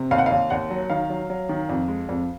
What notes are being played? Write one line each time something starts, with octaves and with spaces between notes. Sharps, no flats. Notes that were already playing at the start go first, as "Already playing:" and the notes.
Already playing: C3
D#2 F5
F#5
F5
D#2
D#2 F#5
F#3
D#3 F5
F#3
F#3
D#3
F2
G#3
F2